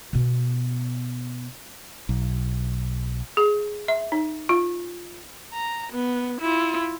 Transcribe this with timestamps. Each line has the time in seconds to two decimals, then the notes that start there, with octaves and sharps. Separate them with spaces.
0.13 B2 B3
2.09 B1
3.37 G#4
3.88 E5
4.12 D#4
4.49 F4
5.53 A#5
5.92 B3
6.41 E4 F4